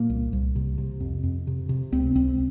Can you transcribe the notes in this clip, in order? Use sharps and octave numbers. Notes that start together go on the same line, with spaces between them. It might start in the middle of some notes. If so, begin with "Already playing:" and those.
Already playing: A#2 A#3
C2
C2
C3
C3
F2
F2
C3
C3
C#2 C4
C#2 C4